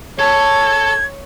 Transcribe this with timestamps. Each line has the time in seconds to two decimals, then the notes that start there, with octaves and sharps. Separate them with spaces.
0.19 A4 C#5 A5 G#6